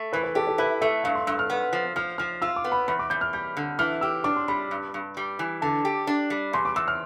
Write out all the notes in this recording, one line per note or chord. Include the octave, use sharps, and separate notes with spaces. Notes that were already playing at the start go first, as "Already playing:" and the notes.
Already playing: A3
E3 B4
B4
G4 A4
A4
E4 B4
A3 E5
G2 F5
C6
G2 E6
F6
B3
F3
F3 F6
F3 F6
F4 E6
D6
B3
B5
E2 B5
D6
E2 G6
F6
G3 G6
D3
E3 F6
G4 E6
D4 D6
C6
G3 B5
G2
G2
G3
E3
D3 A5
G4
D4
G3
E2 C6
D6
E2 E6
F6